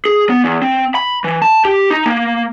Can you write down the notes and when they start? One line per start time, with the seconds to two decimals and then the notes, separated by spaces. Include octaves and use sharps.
0.05 G#4
0.30 B3
0.44 E2
0.62 C4
0.95 B5
1.24 E3
1.42 A5
1.65 G4
1.90 D#4
2.06 A#3